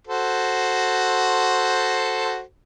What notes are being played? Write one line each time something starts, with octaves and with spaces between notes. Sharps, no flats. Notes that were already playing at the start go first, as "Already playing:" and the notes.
F#4 A4 C5